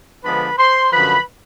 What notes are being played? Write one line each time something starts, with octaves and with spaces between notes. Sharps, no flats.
D3 F3 G#3 B3 D4 B4 B5
C5 C6
F#2 D3 F3 B4 B5